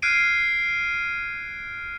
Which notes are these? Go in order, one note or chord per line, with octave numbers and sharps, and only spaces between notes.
F6 F#6 G#6 C7 D7 D#7